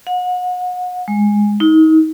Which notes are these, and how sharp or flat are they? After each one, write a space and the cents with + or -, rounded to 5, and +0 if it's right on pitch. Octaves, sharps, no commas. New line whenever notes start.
F#5 -35
G#3 -5
D#4 +30